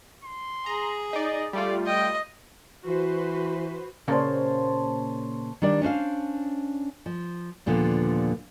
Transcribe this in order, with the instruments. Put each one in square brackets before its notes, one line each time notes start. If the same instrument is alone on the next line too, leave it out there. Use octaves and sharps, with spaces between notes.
[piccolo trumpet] C6
[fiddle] G#4 [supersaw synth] A#5
[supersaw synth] D#4 D5 [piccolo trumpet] D#5
[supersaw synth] G3 A3 F4 [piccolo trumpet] D5
[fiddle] D#5 [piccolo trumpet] G5
[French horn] E3 [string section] F#4 B4 C5
[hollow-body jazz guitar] A#2 C#3 A#3 [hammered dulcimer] C5 C#5 A5
[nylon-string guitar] D#3 G3 D4 D5
C#4 D4 C5 F5
F3
D#2 A#2 D3 F3 B3